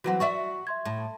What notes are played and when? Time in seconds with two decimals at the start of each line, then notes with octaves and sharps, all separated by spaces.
0.04 E3 F#3 C4 F#4 F#5
0.20 F#4 D5 E5 C#6
0.67 E5 C6 G#6
0.85 A2